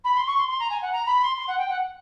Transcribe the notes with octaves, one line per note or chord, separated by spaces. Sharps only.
B5
C6
C#6
C6
C6
A#5
G#5
F#5
A#5
B5
C6
C6
F#5
G5
F#5